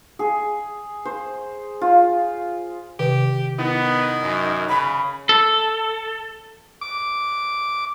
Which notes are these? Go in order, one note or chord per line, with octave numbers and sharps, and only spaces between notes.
G#4
C5
F4
C3 D#3 G4 B4
D#3 B3 E4
F#2
C#3 B5
A4
D6